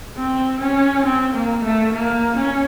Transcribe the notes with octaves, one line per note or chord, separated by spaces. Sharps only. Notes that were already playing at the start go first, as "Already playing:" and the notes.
C4
C#4
C4
A#3
A3
A#3
C#4